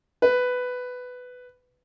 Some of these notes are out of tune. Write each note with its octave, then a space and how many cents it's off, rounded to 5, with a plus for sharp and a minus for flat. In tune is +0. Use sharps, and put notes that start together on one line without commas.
B4 +10